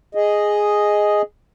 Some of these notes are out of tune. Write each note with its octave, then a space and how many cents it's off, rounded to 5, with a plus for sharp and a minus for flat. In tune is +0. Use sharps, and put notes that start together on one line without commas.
G#4 +0 D#5 +0